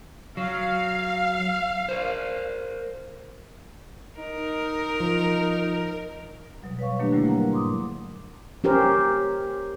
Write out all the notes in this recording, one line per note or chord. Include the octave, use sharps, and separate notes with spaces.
F#3 F5
A#4 C5
D#4 A#4
F3
B2 F#3 G3
B4 C#5 F5 C#6
D#3 F#3 A3 A#3 D4 G4
D3 F#3 G3 A3 E4
E4 A#4 F#5 A#5
G#2 C6 D6 D#6
C#4 G4 A#4 C5